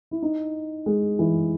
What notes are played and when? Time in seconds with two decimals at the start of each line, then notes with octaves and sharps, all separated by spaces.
0.11 E4
0.22 D#4
0.86 G#3
1.19 E3